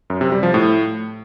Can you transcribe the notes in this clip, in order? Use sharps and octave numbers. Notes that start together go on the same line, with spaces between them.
F#2
C3
G3
F3
A2